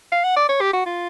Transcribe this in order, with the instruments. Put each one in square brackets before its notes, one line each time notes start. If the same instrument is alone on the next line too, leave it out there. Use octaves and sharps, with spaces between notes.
[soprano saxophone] F5
F#5
D5
C#5
G4
F#4
F4